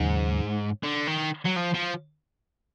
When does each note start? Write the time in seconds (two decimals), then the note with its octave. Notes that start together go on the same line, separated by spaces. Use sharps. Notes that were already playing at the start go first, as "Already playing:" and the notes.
Already playing: D#2 G#2 C#3 F#3
0.84 D3
1.08 D#3
1.45 F#3
1.57 F3
1.74 F3